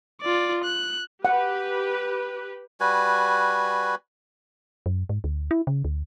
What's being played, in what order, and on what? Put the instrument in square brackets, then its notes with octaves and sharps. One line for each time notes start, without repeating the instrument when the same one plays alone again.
[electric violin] F4 D5
F#6
[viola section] G4 B4 [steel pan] F#5
[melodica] G3 F#4 B4 G#5
[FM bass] F#2
G#2
D2
E4
C#3
D2